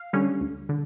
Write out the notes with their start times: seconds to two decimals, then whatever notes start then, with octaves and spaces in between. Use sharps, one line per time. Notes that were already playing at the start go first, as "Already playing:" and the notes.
Already playing: F5
0.13 D3 G3 C#4
0.41 D2
0.69 D3